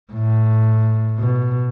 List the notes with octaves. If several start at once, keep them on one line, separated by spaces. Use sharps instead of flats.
A2
B2